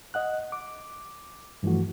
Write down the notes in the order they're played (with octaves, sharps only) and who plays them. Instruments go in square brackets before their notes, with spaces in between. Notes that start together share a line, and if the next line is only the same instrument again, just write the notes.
[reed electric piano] D#5 F#5 F#6
D6
G2 E3 F3 A3 F#4